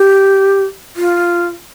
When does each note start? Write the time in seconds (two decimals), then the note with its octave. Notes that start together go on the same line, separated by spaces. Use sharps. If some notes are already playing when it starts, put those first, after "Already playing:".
Already playing: G4
0.96 F4